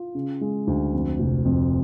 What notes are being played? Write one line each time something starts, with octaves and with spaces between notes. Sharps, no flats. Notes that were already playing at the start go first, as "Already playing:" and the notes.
Already playing: F4
C#3
G#3
D2
F2
F1
F2